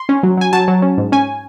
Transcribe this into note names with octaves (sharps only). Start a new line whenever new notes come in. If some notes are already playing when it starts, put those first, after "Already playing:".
Already playing: C6
C#4
F#3
F#3 G#5
F#3 A5
F#3
C#4
G#2
C#4 G#5